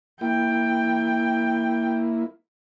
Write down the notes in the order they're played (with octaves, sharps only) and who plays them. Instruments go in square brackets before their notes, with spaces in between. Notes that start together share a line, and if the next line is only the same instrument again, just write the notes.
[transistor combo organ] A#3 E4 [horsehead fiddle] G5